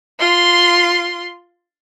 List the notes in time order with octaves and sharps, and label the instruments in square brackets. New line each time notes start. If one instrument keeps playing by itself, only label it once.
[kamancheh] F4 C6